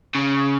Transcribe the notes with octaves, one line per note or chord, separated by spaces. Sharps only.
C#3